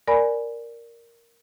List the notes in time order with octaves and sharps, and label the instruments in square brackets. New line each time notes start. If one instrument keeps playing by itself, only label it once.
[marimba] A#4 D5 G#5 B5